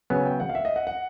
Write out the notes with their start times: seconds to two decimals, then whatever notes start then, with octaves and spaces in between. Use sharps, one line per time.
0.10 C#3 F#3 B3 G#5
0.26 G5
0.40 F#5
0.49 F5
0.55 E5
0.65 D#5
0.76 F#5
0.87 F#5